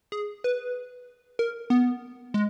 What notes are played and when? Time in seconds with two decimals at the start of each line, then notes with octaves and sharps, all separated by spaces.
0.12 G#4
0.44 B4
1.39 A#4
1.70 B3
2.34 G#3